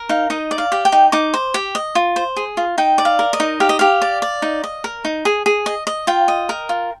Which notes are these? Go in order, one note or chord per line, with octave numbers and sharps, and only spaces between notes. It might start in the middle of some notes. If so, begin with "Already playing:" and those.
Already playing: A#4
D#4 F5
D#4 D#5
D5
F5
G4
G5
D#4
D#4 D6
C5
G4
D#5
F4
C5
G#4
F4
D#4 G5
D5
F5
A#4
D#5
D#4
G4 F5
D#5
G4 F5
D5
D5
D#4
D#5
A#4
D#4
G#4
G#4
D#5
D#5
F4 G5
D#5
A#4
F4